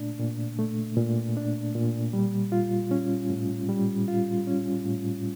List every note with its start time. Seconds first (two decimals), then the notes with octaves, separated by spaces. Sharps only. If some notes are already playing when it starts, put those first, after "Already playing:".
Already playing: A#2 A3 D4
0.20 A#2
0.59 A3
0.97 A#2
1.37 D4
1.74 A#2
2.13 G3
2.52 F4
2.91 C#4
3.30 A2
3.69 G3
4.08 F4
4.47 C#4
4.85 A2